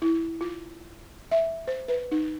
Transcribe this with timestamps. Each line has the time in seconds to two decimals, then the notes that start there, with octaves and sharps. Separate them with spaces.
0.02 E4
0.41 F4
1.31 E5
1.68 C5
1.88 B4
2.11 D#4